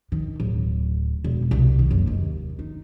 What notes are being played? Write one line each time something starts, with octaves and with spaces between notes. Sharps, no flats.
D#3
D1
E1
C2
D#3
F#1
D#2
D#4